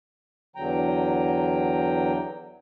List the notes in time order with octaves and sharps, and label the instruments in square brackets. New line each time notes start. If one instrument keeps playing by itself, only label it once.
[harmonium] E2 D3 F#3 G5 A#5